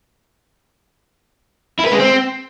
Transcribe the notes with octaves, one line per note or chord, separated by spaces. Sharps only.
E4
B4
G#3
C4